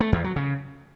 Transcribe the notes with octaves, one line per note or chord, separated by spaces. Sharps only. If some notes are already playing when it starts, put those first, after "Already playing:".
A3
E2
F#3
C#3